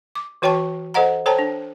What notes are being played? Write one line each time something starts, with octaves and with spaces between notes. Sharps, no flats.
D6
E3 F#4 C#5 G5 A5 C#6
A4 C5 D#5 F#5 A#5
A4 C5 C#5 G5 A5 A#5
D4